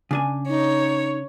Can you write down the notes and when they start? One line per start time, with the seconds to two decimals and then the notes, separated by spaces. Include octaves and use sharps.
0.11 C#3 D4 G#5
0.49 D#4 C#5